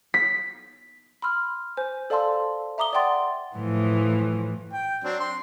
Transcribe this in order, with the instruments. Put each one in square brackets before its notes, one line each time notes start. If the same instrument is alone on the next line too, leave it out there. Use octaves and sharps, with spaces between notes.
[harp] B6
[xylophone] B5 C6 E6 F6
C5 G#5
A4 D5 F5 A5 C6 E6
E5 A#5 D6 D#6 G7
D5 E5 F#5 G5 C6 A6
[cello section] A2 E3 F3
[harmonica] G5
F#3 C4 D4
C6